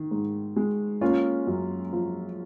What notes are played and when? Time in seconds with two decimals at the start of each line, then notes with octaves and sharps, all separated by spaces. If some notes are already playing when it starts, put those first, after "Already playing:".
Already playing: D#3
0.11 G#2
0.56 G#3
1.01 A#3 C#4 F4
1.47 F#2
1.93 F3